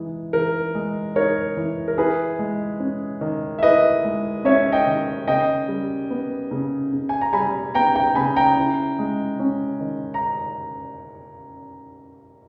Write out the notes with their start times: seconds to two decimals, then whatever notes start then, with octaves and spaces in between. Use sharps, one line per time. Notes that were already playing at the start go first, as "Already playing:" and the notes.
Already playing: E3 G#3 D#4
0.33 E3 A#4
0.75 G#3
1.16 D#4 A#4 C#5
1.57 E3
1.88 A#4
1.98 E4 G#4 B4
2.39 G#3
2.80 C#4
3.21 D#3
3.59 E5
3.63 E4 B4 D#5
4.04 G#3
4.45 C#4 C#5 E5
4.72 D#5 G5
4.87 D#3
5.27 C#3 D#5 G5
5.68 G3
6.10 B3
6.51 C#3
6.93 C#3
7.09 G#5
7.21 A#5
7.33 G3 G#5 B5
7.75 B3 G5 A#5
7.95 G5 A#5
8.15 C#3 G#5 B5
8.36 G5 A#5
8.57 E4
8.99 G#3
9.39 C#4
9.81 D#3
10.14 A#5